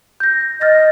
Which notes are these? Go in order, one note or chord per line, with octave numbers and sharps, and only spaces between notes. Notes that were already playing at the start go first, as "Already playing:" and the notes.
G6 A#6
D#5 F6 A6 A#6